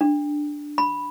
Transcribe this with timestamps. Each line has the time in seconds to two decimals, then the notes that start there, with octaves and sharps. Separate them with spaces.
0.01 D4
0.78 B5